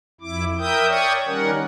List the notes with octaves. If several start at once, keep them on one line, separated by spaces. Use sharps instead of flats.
F2 E4 D6
A#4 E5 G5 D#6 G6
C#5 D5 G5 C#6 D#6
D#3 G3 C#4 A#4 F#5